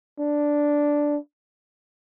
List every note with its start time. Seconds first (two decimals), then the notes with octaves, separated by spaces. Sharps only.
0.20 D4